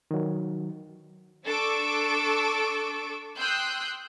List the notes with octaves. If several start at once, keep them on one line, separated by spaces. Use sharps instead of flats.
D#3 F#3
D4 A4 C#6 D6 E6 D7
G5 C6 D#6 E6 F#6 G6